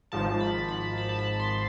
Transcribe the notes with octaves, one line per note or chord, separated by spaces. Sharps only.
G#1 G#2 F3 A5
B5
B5
B5
A5
B5
C6